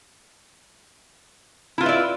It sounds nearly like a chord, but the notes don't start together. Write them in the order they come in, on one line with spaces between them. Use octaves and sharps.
E4 F4 B4 E5 D5